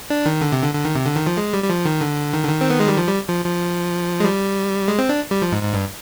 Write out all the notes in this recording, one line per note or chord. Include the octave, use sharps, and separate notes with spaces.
D4
D#3
D3
C3
D3
D3
D#3
C3
D3
D#3
F3
G#3
G3
G3
F3
D#3
D3
D#3
D3
D#3
C4
B3
G#3
G3
F3
G3
F3
F3
G#3
G3
G#3
C4
D4
G3
F3
G#2
G#2
G2